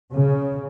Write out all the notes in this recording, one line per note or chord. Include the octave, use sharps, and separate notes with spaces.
C#3